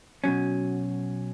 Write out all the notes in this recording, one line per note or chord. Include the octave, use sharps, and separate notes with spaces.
B2 F#3 C#4